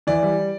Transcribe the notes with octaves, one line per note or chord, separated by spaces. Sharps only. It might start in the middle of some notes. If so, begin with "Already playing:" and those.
E3 D5
G3